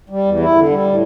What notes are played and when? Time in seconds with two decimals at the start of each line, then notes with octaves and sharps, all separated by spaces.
0.10 G3
0.25 E2
0.40 E4
0.54 D3
0.69 G3
0.84 A2